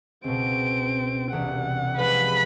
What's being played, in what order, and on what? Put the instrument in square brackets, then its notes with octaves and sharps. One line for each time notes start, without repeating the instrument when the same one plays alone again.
[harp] C#2 B2 [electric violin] C4 D7
[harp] E1 C2 G4 [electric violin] F#5
[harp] F3 G#3 [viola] B4 B5